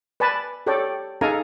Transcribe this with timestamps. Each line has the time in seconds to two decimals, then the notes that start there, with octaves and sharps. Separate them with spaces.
0.20 B4 D5 G#5 A5 B5
0.66 G4 A4 C#5 D5 G5
1.21 D#4 G#4 A4 F5 G#5 A#5